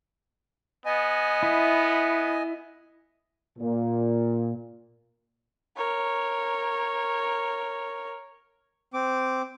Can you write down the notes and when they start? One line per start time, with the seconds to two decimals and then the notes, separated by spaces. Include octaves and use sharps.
0.86 B3 D#5 G#5
1.43 E4
3.59 A#2
5.76 A#4 C#5
8.94 C4 D6